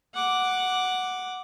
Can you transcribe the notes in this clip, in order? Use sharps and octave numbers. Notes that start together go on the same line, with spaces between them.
F#5 D6